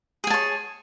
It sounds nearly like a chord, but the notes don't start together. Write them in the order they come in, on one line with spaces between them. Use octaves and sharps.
G#4 G#5 A5 C#5